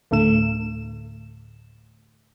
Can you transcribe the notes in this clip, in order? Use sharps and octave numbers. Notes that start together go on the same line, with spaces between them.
D2 A2 D3 A3 E7